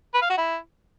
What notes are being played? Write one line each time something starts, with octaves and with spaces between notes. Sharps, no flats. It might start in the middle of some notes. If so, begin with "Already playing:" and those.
B4
F5
F#4
E4